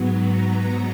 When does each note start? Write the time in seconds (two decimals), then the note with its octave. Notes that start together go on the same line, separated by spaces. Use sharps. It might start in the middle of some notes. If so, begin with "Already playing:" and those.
Already playing: G#2 F#3 B3
0.29 A#5